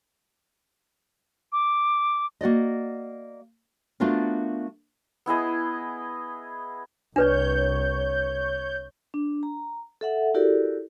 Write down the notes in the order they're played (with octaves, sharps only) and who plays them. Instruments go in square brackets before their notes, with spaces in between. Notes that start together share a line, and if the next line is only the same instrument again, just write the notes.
[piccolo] D6
[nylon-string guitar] A#3 F#4 D5 D#5
A3 B3 D4 F4 F#4 A#4
[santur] B3 E4 G#4 D#5
[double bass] C2 [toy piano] D4 B4 D5 [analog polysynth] C#5 G6
[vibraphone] D4
A#5
A4 E5 F#5
E4 F#4 G4 A4 A#4 D5